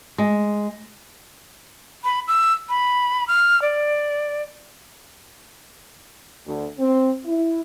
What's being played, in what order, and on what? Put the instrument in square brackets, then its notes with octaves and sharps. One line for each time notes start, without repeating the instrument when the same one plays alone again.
[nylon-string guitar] G#3
[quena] B5
E6
B5
F6
D5
[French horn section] D2
C4
E4